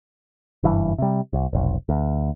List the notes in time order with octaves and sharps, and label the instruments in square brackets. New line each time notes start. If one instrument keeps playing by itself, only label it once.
[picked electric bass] F#1 G2 E3
C3 G3
C2
F1 B1
D2